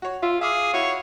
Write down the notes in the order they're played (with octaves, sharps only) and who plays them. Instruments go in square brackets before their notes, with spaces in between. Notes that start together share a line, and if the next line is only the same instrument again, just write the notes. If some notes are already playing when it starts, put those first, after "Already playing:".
[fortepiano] F#4 C#5
[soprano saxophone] F4 [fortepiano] E5
[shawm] G#4 [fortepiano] E5 D6 F6 [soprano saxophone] F5
[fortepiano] E4 F#4 [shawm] C#5